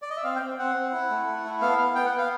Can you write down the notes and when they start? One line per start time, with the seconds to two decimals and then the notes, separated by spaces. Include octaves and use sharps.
0.02 D5
0.10 D#5
0.17 E5
0.24 C4 F5
0.36 G5
0.41 C4
0.58 C4 F#5
0.76 C4
0.92 E4
1.10 A3
1.27 A3
1.44 E4
1.61 B3 F5
1.78 B3 F5
1.95 B3 G5
2.06 F#5
2.12 B3
2.18 F5